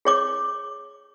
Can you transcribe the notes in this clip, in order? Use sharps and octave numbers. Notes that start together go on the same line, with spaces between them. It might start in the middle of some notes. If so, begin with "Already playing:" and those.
G#4 C#5 D6